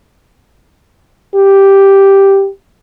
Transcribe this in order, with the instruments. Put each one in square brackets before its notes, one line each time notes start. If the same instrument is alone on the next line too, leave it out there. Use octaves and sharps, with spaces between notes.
[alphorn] G4